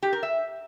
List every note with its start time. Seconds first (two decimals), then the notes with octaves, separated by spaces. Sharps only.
0.03 G4
0.13 A#4
0.23 E5